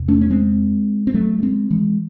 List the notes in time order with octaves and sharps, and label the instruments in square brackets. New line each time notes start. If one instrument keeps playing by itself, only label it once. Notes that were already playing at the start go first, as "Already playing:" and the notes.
Already playing: [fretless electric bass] E2 C3
A3 C#4
C#4
G#3 C4
C4
F#3 A3
A3
G#3 C4
E3 G#3